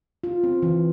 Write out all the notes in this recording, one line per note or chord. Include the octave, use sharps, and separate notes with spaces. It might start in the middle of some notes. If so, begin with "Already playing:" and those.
F4
C4
E3